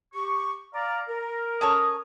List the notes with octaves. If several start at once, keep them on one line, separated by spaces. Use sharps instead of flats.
G4 C#6
D5 F5 A#5
A#4
C#4 A4 C#5 D#6